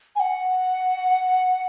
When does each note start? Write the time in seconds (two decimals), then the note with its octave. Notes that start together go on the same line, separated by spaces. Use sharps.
0.16 G#5
0.20 F#5